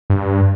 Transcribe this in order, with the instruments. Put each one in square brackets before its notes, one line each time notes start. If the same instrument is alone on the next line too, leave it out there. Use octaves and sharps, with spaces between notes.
[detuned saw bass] G2